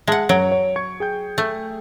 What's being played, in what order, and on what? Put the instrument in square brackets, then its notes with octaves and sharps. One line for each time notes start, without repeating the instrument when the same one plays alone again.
[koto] G#3 F#5 [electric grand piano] E5 A5
[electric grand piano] F#2 C#5 D7 [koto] F#3
[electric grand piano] C#5
C#6 G#6 C#7
G#4 G5 G6
[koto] A3